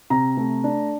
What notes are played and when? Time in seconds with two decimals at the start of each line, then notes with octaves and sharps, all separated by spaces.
0.10 C3 A#5
0.37 A3
0.64 D4